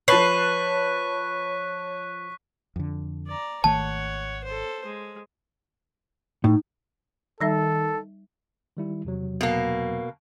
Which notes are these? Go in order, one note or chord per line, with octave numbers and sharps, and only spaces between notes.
F3 B4 C#5 A5 C#6 F#6 B6 C7
F2 D3
D5 A#5
G#1 D#3 A3 C#5 F#5 A5
A4 C5
G#3
A2 D#4
D#3 G3 D#4 A4 E5
D#3 G3 E4
E2 C3 F#3
B2 A#3